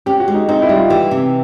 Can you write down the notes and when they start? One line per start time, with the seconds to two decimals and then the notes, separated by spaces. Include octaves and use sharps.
0.06 C#4 G4
0.20 F#4
0.28 G#3
0.34 D#4
0.48 C4 D#4
0.62 E4
0.69 G3
0.76 F4
0.90 E3 G4
1.11 C3